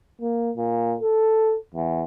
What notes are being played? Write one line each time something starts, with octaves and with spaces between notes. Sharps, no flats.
A#3
A#2
A4
E2